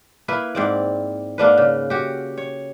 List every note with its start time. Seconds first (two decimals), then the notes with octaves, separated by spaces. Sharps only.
0.28 A#3 E4 B4
0.55 G#2 C4 D5
1.38 G#2 A#3 D4 B4
1.58 C#3
1.90 F#4 G4
2.38 C#5